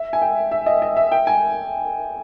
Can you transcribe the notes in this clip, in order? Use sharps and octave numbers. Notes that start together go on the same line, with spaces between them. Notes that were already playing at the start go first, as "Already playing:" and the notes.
Already playing: E5
G#5
G5
E5
D#5
D#5
E5
G5
G#5